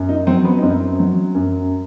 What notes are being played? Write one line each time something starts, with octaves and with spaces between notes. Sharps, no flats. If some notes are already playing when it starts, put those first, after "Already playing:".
Already playing: F#2
D#4
F#3 C4
B3
D#4
F#2 C4
F#3
F#2